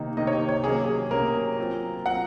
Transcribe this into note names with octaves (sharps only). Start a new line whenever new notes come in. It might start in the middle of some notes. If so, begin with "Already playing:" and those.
Already playing: C3 D#3 A#3 D#4
C3 D#3 A#3 D#4 D#5
C#5
D#5
C#5
C3 F#3 A#3 C#4 G#4
G#4
C3 F#3 A#3 C#4 A#4
F#3 C4 F4
F#3 C4 F4 F#5